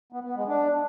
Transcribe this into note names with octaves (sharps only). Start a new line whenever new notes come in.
B3
B3
G#3
D4